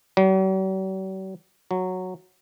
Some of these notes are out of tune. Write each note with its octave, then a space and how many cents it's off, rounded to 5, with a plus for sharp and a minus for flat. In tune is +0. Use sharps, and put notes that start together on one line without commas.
F#3 +45
F#3 -10